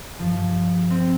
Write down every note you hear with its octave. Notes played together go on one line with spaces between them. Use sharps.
G2 F3
C4